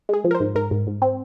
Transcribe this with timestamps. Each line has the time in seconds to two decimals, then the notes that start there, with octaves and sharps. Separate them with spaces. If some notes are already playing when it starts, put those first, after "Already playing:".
0.09 G#3 G#4
0.24 F3
0.31 A#4
0.35 C5
0.40 G#2
0.55 G#2 A#4
0.71 G#2
0.87 G#2
1.02 C4